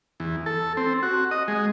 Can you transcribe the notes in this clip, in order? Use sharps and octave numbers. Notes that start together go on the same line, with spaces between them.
E2
A4
C4
F#4
D#5
G#3